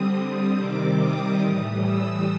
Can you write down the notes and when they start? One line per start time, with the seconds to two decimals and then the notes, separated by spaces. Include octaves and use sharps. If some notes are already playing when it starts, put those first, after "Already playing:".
Already playing: D3 G3 C4 D#6
0.58 C3 D#3 G3 C4 D6
0.99 D#6
1.41 A2 E3 G3 D#6
1.82 E6